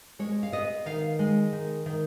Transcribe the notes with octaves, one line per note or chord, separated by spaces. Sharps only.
G#3 C#5
F5
B3 D#5
D#3 F5
G#3
D#3
D#3